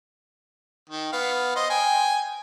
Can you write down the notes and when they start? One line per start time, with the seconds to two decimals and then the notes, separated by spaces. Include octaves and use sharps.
0.89 D#3
1.13 B3 F5
1.56 C5 D#5
1.70 G5 G#5